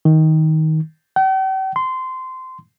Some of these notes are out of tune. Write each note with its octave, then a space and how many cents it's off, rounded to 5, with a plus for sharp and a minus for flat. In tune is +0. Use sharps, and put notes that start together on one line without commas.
D#3 +15
G5 -45
C6 -20